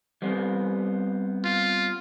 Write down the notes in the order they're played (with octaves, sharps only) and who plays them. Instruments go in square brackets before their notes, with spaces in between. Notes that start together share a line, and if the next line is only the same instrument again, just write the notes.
[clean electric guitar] G3 B3 C4
[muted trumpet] F4